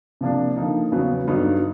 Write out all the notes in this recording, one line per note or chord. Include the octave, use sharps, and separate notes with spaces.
C3 F3 A#3 D4
D3 F3 A#3 D#4
E2 C#3 F#3 B3
G2 D3 F#3 B3 D#4